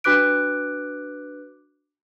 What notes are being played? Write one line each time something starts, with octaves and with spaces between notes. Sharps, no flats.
D4 F#4 B4 D6 F#6 D7